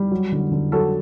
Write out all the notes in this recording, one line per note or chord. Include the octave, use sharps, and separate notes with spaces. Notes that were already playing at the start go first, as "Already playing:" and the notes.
Already playing: G3
F#3
D3
D3
F#3 F#4 A4